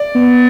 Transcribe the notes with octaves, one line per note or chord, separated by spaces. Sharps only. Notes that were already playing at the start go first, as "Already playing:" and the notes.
Already playing: D5
B3